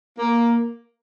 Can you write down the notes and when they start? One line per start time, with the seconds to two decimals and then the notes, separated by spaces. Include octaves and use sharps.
0.18 A#3